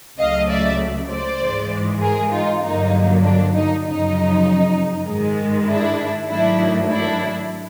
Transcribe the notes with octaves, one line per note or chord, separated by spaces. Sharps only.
C#2 C#3 F#3 A3 D#5 F5
D5 E5
C5 D5
G#2 E3 G#3
G#4 A#4
D#4 F4
G2 D3 F#3 A#3 D#4
D4
D#4
F#2 C#3 F3 D#4
G#2 D#3 G#3
D4 E4
G#2 D#3 F#3 A3 D4 E4
D4 E4